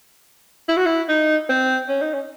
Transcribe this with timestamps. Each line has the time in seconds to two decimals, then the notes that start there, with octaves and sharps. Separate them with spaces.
0.68 E4
0.77 F#4
0.86 E4
1.08 D#4
1.49 C4
1.89 C#4
2.02 D#4
2.14 C#4